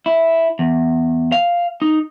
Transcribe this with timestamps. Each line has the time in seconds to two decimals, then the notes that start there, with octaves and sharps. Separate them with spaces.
0.06 E4
0.59 E2
1.32 F5
1.82 D#4